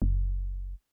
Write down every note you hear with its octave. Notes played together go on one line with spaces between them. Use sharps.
F#1